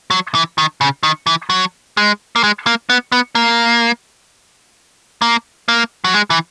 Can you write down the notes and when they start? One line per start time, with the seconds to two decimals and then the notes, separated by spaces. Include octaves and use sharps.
0.11 F#3
0.35 E3
0.58 D#3
0.81 C#3
1.03 D#3
1.27 E3
1.50 F#3
1.97 G#3
2.36 A#3
2.44 G#3
2.67 A#3
2.90 B3
3.12 B3
3.35 A#3
5.22 A#3
5.69 A#3
6.04 F#3
6.14 G#3
6.30 E3